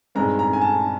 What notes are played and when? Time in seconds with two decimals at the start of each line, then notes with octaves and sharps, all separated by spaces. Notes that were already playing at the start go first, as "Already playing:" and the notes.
0.15 G2 D#3 G#3 C4 A#5
0.39 A#5
0.53 G#5
0.61 A5